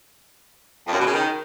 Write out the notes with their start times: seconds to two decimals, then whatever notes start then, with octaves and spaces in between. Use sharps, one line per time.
0.86 F2
0.93 F#2
1.00 B2
1.07 C#3
1.13 D#3